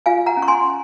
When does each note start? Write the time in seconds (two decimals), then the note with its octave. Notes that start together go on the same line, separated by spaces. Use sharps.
0.06 F4 F5 G#5
0.26 F#5 A#5
0.37 C#4
0.42 C#6
0.48 G#5 C6